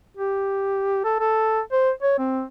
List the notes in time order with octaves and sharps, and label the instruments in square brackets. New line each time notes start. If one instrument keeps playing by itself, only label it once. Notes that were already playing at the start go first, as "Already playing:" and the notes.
[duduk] G4
A4
A4
C5
C#5
C4